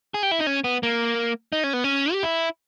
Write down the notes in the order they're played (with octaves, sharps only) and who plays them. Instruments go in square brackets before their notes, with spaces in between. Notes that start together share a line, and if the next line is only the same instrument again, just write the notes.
[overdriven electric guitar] G#4
G4
E4
D#4
C#4
B3
A#3
D#4
C#4
B3
C#4
G4
E4